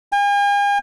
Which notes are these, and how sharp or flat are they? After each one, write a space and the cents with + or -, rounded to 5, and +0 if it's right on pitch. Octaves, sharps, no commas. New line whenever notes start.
G#5 -45